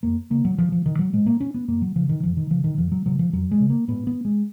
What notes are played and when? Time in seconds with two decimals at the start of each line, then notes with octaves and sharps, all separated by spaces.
0.03 F2 A#3
0.30 C#3 A#3
0.45 F#3
0.58 G#2 F3
0.72 F3
0.86 D#3
0.99 F#3
1.13 G#2 G#3
1.26 A#3
1.40 C#4
1.54 B3
1.68 F#2 A#3
1.82 F#3
1.95 C#3 F3
2.09 D#3
2.23 F2 F3
2.37 D#3
2.50 C#3 F3
2.64 D#3
2.78 F2 F3
2.92 F#3
3.06 C#3 F#3
3.19 F3
3.33 F2 F#3
3.51 G#3
3.60 C#3
3.70 A#3
3.88 G#2 B3
4.07 B3
4.25 G#3